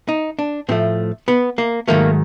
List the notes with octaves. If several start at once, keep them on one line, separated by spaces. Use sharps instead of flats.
D#4
D4
A2 F3 A3 C4
B3
A#3
G#2 D#3 F#3 A3 A#3